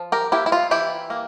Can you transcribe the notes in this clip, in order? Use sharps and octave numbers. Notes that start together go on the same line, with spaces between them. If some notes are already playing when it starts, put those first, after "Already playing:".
Already playing: F3
G4 A#4
A#3 E4 G4
E4
F4
E3 E4 G4
A#3